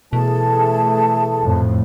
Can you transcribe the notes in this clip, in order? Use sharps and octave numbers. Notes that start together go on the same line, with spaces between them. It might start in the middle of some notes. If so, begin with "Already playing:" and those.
B2 E3 A3 G#4 A5
F2 A2